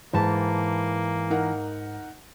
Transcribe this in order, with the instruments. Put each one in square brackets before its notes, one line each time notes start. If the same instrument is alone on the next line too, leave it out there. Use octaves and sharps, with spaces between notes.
[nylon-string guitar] G#2 A5 [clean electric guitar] E3 [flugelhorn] A#3
[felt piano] D#4 A#4 F#5